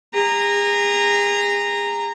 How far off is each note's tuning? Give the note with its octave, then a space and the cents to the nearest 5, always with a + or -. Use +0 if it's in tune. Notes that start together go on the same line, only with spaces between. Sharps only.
G#4 -35 A#5 -10